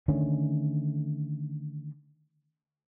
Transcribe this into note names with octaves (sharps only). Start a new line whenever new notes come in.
D3 D#3 A3 C#4